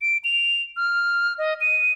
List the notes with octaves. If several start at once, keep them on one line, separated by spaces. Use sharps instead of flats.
D7
F7
F6
D#5
D#7